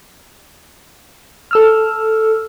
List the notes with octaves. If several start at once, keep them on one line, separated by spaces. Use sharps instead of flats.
A4 E6 F6